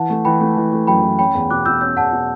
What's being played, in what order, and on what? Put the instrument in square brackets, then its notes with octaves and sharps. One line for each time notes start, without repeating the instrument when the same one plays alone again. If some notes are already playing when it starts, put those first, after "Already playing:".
Already playing: [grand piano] E3 [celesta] F#5 A5
[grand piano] A3
[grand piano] E3 [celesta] G5 B5
[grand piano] A3
E3
A3
[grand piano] F#2 [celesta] G5 B5
[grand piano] E3
[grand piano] C#4 [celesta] G5 B5
[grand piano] E2
[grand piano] B2 [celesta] D6 F#6
[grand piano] B2 [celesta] E6 G6
[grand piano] C#4 [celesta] E6 G6
[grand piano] E2 [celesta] F#5 A5
[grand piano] B2